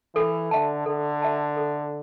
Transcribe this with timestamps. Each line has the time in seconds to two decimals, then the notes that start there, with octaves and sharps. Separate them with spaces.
0.15 E3 A4
0.51 D3 E5 A5
0.86 D3 A4
1.22 E5 A5
1.57 A4